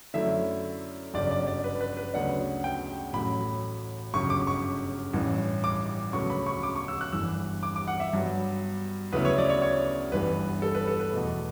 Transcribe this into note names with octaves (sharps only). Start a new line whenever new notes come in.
F#2 D3 A3 E4 E5
G1 F#2 C#3 D5
D5
D5
B4
B4
B4
D2 C#3 F#3 B3 D4 F#5
G5
A1 A2 F#3 B5
G1 F#2 C#3 C#6
D6
C#6
A1 G2 E3
D6
D2 C#3 F#3 B3 C#6
B5
C#6
D6
C#6
E6
F#6
G1 G2 E3 E6
D6
D6
F#5
E5
G2 F#3 B3
D2 C#3 F#3 B3 E4 B4
C#5
D5
C#5
C#5
G1 G2 E3 G3 B3 B4
A4
B4
A4
B4
E2 B2 A3